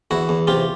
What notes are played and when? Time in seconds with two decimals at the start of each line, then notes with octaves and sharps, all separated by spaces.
0.11 E2 E4 F#4
0.29 E2
0.47 C3 F4 G4